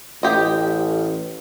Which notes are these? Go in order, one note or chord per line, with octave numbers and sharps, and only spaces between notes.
A1 G4 D#5